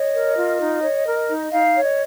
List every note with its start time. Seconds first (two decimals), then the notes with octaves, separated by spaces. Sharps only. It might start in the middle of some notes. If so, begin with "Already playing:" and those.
Already playing: C#5 D#5
0.13 A#4
0.36 F4
0.59 D#4
0.82 C#5
1.06 A#4
1.29 D#4
1.51 D#4 F5
1.76 C#5
1.83 D#5